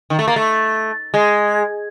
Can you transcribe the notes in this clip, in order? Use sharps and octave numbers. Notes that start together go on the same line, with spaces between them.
D#3
A3
A#3
A3
G#3